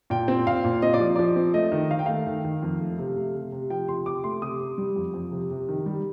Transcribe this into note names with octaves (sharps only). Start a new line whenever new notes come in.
A#2 G5
C4
A#2 F5
A#2
C4 D#5
D5
F3
F3 D5
C4
A3 D#5
D#3
D#3 F5
G5
A3 F5
D#3
D#3
F2
A3
C3
A3
C3
C3
F3 G5
C3 C6
C3 D6
A3 C6
C3 D#6
C3
G3
F2
F2
C3
C3
D#3
G3